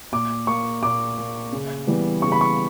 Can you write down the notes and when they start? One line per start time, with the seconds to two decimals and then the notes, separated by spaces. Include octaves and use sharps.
0.12 A#2 D6
0.47 A#3 C#6
0.83 A#2 D6
1.17 A#3
1.53 C#3
1.87 E3 G3 B3
2.22 C#3 C#6
2.32 B5
2.41 C#6